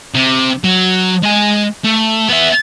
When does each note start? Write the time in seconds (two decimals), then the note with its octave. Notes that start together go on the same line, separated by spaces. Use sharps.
0.15 C3
0.64 F#3
1.23 G#3 G#5
1.84 A3
2.29 B3 E5